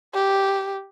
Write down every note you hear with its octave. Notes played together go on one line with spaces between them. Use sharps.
G4